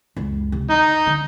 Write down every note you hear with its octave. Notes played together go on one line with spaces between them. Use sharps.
C#2 F#2
C3
D2 D#4
D3